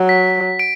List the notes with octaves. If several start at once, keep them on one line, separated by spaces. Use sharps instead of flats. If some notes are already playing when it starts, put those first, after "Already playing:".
Already playing: F#3
B6
D7